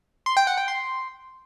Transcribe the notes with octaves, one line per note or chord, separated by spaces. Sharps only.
C6
G5
F#5
G5
C6